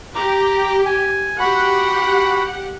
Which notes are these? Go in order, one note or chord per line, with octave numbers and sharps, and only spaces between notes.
G4 A#5 D6
G#5
F#4 G4 F#5 B5